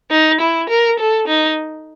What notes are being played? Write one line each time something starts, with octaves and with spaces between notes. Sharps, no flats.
D#4
E4
A#4
A4
D#4